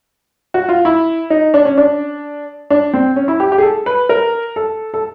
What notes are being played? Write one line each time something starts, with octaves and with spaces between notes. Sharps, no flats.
F#4
F4
E4
D#4
D4
C#4
D4
D4
C4
C#4
E4
G4
G4
G#4
A4
B4
A#4
A4
A4